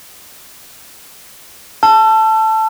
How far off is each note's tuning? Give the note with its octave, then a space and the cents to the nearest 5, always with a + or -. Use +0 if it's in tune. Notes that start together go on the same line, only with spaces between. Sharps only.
A5 +0 E6 +35